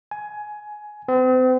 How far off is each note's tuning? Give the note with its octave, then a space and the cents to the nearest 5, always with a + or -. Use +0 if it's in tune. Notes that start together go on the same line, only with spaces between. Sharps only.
G#5 +15
C4 -40